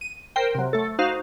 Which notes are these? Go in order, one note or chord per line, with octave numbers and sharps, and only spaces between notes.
D#7
A#4 C5 G5
C3 F#3
A3 A4
D#4 F#4 C5 F5